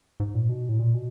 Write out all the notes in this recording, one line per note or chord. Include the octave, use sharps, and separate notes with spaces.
G#2
A#2
B2
A2
A#2
B2